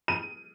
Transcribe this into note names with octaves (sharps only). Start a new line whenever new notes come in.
D#7